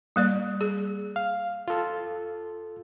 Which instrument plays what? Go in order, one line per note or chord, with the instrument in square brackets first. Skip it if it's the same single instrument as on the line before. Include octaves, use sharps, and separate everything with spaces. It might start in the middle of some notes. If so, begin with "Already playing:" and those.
[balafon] G3 A#3 D5
G#4
[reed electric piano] F5
F4 A4